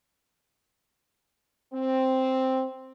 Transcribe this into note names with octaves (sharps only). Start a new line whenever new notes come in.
C4